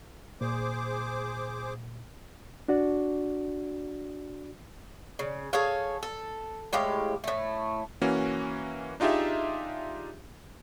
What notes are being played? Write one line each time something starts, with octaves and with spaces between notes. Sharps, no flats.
A#2 G#4 C5 D6
D4 F#4 D5
C#3
G#4 A4 C#5 F5
A4
A2 G#3 G4 F5
A2 A3
E3 A#3 C#4 F#4
D4 D#4 F4 G4 G#4 E5